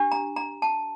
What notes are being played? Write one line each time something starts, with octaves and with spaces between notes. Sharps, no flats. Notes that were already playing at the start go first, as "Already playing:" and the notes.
Already playing: D4 G4
A#5
A#5
A5